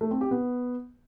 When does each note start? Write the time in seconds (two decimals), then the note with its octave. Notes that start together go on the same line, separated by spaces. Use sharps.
0.01 A3
0.11 C4
0.21 G4
0.31 B3